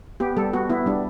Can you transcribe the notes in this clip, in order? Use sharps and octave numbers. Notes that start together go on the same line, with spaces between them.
B3 G4
G3 A4
B3 F#4
B3 E4
G3 D4